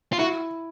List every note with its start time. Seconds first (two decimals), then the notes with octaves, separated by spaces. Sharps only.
0.13 F4
0.19 E4 F#4